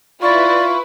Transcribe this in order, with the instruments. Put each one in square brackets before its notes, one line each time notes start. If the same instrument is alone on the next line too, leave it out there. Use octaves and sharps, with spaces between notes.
[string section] E4 B4 [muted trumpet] F4 [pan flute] D5 [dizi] C#6